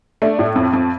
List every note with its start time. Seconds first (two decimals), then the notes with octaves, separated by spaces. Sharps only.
0.22 A3 D4
0.39 A2
0.56 F2
0.73 F2